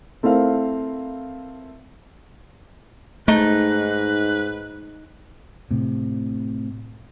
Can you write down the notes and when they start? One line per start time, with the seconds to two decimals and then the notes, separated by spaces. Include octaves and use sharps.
0.23 A3 C4 E4 A#4 F5
3.28 G#2 A3 D#4 B4
5.71 A2 C3